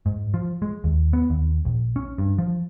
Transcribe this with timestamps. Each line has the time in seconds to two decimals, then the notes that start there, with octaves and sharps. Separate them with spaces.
0.06 G#2
0.34 F3
0.62 G#3
0.84 D#2
1.13 B3
1.30 D#2
1.65 A#1
1.96 C#4
2.18 G2
2.38 F3